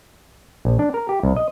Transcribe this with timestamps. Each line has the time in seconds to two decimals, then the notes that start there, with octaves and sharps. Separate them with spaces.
0.65 A#1
0.79 D4
0.94 A#4
1.09 G4
1.23 C2
1.36 D#5